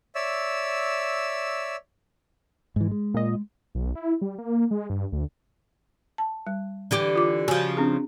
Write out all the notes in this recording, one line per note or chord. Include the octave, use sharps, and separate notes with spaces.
C#5 D5 E5 E6
G#2 E3
G#3
A#2 D#5
B1
E4
G3
A#3
G#3
G2
D2
A5
G3
D3 E3 G4
F4 D6
C#3 F3 F#4 G#5
C4 D4 G#4